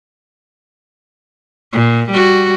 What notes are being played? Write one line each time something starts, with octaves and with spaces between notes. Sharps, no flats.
A#2
G3 F#4